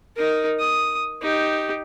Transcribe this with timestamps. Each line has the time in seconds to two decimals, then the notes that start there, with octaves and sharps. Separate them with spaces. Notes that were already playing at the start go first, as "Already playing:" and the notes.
0.16 D#4 A#4
0.60 D#6
1.22 D#4 G4